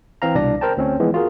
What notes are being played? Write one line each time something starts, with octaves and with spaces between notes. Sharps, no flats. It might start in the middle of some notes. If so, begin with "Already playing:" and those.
E3 C4 F5 A#5
C2 B2 D4 D5 A#6
A#4 C5 G5 A5
D2 C4 C#4 C#5
E3 F3 G#3 B3
F4 F#4 G#4 A#4